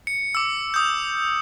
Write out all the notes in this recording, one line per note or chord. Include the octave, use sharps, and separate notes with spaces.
C#7
D6 E6
D#6 G6